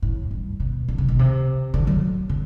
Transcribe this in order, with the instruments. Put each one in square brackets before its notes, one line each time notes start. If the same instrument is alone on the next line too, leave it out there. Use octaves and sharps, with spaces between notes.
[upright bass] A2
G2
B2
D3
C3
B2
C3
D3
F#3
D3